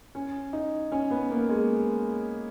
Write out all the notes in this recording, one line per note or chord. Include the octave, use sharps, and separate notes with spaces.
C#4
D#4
C#4
B3
A#3
G#3